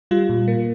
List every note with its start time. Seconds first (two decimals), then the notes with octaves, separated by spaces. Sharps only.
0.11 G3 F4
0.29 A#2
0.48 A#3